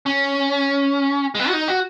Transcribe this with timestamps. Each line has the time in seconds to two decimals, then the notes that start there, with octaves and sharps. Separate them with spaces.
0.06 C#4
1.35 G#3
1.39 B3
1.48 F#4
1.53 D#4
1.68 F#4